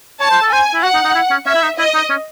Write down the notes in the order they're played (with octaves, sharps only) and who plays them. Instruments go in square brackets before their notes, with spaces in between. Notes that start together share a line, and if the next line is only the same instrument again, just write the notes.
[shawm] C#5 [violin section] A5
[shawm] C5
A4
[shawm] C5 [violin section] G#5
[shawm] E4
[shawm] F#4 [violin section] F#5
[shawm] D#4
D#4
E4
C#4
[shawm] C#4 [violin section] E5
[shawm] E4
D#4
[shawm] E4 [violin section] D#5
[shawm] D#4
C#4